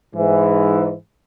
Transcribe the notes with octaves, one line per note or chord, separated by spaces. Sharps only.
G#2 E3